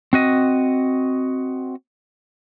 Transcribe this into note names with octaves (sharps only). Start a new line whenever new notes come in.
C4 F#4 D#5